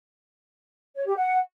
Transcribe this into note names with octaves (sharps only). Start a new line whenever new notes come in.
C#5
G4
F#5